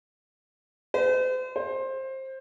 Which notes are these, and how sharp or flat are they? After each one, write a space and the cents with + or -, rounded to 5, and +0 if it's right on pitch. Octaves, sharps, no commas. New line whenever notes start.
C5 -40
C5 +20